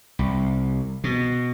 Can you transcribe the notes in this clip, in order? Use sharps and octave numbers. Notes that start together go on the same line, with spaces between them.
C2
B2